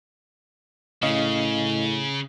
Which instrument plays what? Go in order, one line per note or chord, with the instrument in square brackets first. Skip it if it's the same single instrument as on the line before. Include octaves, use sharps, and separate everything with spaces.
[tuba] A2 [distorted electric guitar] C#3 [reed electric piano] C#4 D#5 F5